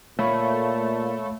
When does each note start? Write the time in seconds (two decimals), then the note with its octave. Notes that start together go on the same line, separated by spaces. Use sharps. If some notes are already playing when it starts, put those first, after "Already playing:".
0.19 A#2 A3 C#5 F5 B5